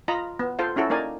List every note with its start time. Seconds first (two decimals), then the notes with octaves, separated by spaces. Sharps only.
0.08 F4 D#5 A#5 B5
0.39 B3
0.59 F4 A4 C5 F5
0.76 C#4 E4 F#4 A4
0.90 A#3 D#4 A#4 D5 G#5